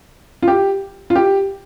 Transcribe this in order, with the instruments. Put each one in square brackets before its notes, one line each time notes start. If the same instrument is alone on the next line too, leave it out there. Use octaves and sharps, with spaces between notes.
[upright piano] F4
G4
F4
G4